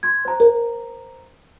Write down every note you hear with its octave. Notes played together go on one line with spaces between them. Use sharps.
C6 G#6
C5 A#5
A#4